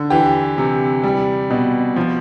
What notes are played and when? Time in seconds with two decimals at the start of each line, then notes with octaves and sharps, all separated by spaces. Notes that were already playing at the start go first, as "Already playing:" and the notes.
Already playing: D3
0.10 E3 G4
0.58 C3
1.03 G3
1.50 B2
1.96 F3